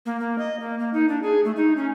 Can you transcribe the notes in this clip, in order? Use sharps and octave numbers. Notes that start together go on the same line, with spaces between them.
A#3
A#3
D#5
A#3
A#3
D#4
D4
G#4
A3
D#4
C#4